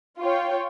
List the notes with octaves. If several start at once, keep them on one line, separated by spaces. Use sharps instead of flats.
F4 C#5 G5